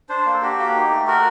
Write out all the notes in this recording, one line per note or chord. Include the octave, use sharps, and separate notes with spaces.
D4 C5
A#3
A4
F#4 G4
A#3
D#4
A3
F#4 A#4